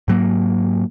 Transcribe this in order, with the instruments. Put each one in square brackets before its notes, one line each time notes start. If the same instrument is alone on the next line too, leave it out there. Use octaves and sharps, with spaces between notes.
[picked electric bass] G#2 F#3 A#3